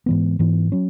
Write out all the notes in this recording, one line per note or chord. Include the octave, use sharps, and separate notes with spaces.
G#2 E3 B3
G#2 E3 B3
F#3 C#4